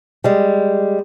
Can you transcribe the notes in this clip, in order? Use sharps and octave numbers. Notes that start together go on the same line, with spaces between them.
G3 G#3